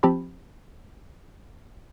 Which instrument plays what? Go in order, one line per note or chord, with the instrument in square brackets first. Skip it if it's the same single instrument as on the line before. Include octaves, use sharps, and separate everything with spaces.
[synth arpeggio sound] F3 C4 G4 A5 B5